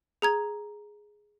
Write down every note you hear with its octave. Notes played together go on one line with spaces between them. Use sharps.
G#4 A#5 G#6